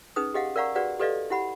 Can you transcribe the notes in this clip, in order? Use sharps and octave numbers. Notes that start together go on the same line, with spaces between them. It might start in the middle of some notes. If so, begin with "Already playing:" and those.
C#4 D#4 G#4 B4 D#6
G4 G#4 D#5 F5 F#5
A#4 D5 F5 F#5 A#5 C#6
F#4 G#4 B4 D5 F#5
G4 A4 B4 D5 D#5 F5
E4 G4 F#5 B5